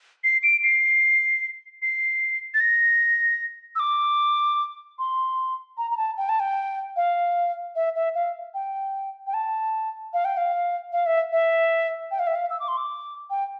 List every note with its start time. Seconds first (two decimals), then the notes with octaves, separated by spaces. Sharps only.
0.24 C7
0.43 D7
0.63 C7
1.82 C7
2.54 A6
2.60 A#6
3.76 E6
3.79 D6
4.99 C6
5.78 A#5
5.91 A#5
5.97 A5
6.17 G5
6.29 A5
6.40 G5
6.96 F5
7.75 E5
7.95 E5
8.15 F5
8.54 G5
9.27 G5
9.34 A5
10.13 F5
10.25 G5
10.37 F5
10.92 F5
11.06 E5
11.32 E5
12.11 G5
12.19 F5
12.27 E5
12.35 F5
12.50 E6
12.60 D6
12.68 C6
12.77 D6
13.30 G5